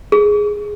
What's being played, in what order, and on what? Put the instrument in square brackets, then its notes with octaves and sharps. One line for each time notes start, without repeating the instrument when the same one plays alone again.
[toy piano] G#4